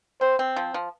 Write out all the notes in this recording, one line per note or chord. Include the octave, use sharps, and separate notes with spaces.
C4 C5
C4
F3
F3